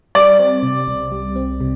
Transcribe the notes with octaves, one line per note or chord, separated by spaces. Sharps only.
G3 D5
C4
C3
C2
G3
C4
C3